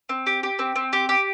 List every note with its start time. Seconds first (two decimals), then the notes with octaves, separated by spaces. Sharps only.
0.09 C4
0.27 G4
0.43 G4
0.59 C4
0.76 C4
0.93 G4
1.09 G4